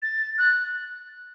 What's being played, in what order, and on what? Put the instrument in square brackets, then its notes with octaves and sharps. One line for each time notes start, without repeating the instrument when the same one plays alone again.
[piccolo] A6
F#6